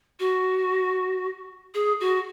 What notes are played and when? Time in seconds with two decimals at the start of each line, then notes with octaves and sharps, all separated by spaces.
0.20 F#4
1.74 G#4
2.00 F#4